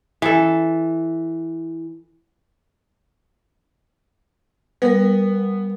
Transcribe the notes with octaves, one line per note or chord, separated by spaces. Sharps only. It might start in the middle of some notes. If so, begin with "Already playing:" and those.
E3 A4
G3 B3 A#4